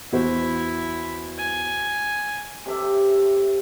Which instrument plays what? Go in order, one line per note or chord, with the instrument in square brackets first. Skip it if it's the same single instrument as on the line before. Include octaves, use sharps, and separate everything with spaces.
[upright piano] E2 F#4 C5 [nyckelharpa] E4
[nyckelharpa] G#5
[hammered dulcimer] C3 A4 E5 D6